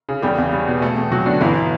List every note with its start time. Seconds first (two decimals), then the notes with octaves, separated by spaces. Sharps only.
0.09 C#3
0.22 E2 G3 G4
0.38 E2
0.53 G3
0.67 B2
0.82 A3
0.97 E2
1.12 F#3 F#4
1.26 B2 D3 D4
1.41 G1 E3 E4